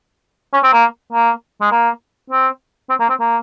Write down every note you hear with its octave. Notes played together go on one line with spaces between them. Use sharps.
C#4
C4
A#3
A#3
G#3
A#3
C4
C4
A#3
C4
A#3